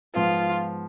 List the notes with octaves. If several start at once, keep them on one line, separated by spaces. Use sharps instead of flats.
G#2 F3 B3 F4